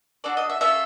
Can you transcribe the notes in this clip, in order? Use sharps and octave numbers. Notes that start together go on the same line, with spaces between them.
D4 F#4 A4 D5
D#5
E5
C#4 F4 A4 E5